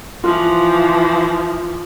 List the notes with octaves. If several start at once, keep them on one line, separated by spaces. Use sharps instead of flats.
E3 F3 F4